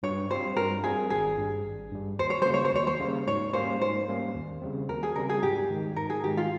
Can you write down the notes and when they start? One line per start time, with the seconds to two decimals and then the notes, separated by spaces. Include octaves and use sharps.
0.03 G2 C#5
0.30 G3 C4 F4 C5
0.57 G2 A#4
0.84 G3 C4 F4 G#4
1.10 G#1 G#4
1.38 G2 G3
1.65 G#1
1.92 G2 G3
2.19 D#2 C5
2.30 C#5
2.42 C#3 G3 A#3 C5
2.54 C#5
2.65 C5
2.73 D#2 C#5
2.87 C5
3.00 C#3 G3 A#3
3.27 G#2 C#5
3.53 G3 A#3 C#4 C5
3.81 G#2 C5
4.08 G3 A#3 C#4
4.35 D#2
4.62 C#3 G3 C4
4.89 D#2 A#4
5.03 G#4
5.16 C#3 G3 C4 A#4
5.29 G#4
5.43 G#2 G4
5.70 D#3 G#3
5.96 G#2 A#4
6.10 G#4
6.24 D#3 G#3 G4
6.37 F4